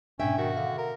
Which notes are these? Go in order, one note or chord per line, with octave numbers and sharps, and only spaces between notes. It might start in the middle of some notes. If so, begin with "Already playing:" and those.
G#2 B2 C#4 D4 E5 G5
D#3 F#4
D3 F5
A#4